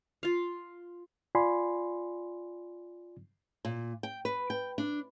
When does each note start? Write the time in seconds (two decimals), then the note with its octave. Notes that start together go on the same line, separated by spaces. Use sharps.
0.23 F4 F5
1.35 F4 D5 G#5 B5 C6
3.65 A#2
4.03 G5
4.25 B4
4.50 G5
4.78 D4